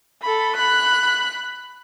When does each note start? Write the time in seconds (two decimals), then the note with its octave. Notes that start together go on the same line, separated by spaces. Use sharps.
0.22 A4 B5
0.56 B5 F#6